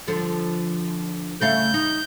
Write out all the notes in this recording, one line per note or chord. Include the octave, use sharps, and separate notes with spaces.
D3 F3 A4
C#3 A3 F5 G6
D#4